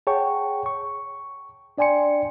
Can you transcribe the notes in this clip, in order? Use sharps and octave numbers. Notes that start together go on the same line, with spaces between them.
G#4 C#5 F#5 G5 A5 C#6
C#6
D4 D5 G5 G#5 C6 C#7